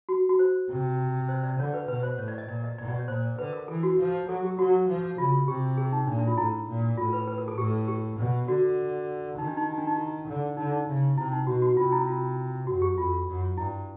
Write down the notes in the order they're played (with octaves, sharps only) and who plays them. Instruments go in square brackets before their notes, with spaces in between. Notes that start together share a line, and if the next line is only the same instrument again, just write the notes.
[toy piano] F#4
F#4
C5
[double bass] C3
[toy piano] C5
D5
[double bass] D3 [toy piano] C#5
[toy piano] B4
[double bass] B2 [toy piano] B4
[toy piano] C5
[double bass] A2 [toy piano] C#5
[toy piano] D5
D#5
[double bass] A#2 [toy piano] D5
[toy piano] D#5
[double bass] B2 [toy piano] D5
[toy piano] D5
C#5
[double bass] A#2 [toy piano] C5
[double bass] D3 [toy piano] B4
[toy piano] A#4
[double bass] E3 [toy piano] A4
[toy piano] F#4
[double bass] F3
[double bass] F#3 [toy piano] A4
[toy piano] G4
[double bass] F#3 [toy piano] F#4
[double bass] F3
[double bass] C#3 [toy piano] F4
[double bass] C3 [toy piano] G4
[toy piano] G#4
D#4
[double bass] A#2 [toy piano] D4
[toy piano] D4
F4
[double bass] A2 [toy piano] E4
[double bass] A#2
[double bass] A2 [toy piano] F4
[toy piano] B4
B4
A#4
A4
[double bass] A2 [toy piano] G4
[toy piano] G4
[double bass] B2
[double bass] D3 [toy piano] F#4
[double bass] D#3 [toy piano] D#4
[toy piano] D4
D#4
D#4
D4
D#4
E4
[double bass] D3
[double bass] D3 [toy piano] D#4
[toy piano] D#4
[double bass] C#3
[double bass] C3 [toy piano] E4
[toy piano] D#4
[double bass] B2 [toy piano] F#4
[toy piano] F#4
[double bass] C3 [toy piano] F4
[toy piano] E4
F4
[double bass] F#2 [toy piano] F#4
[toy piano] G4
[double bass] F2 [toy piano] F4
[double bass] F#2
[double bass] G2 [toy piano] E4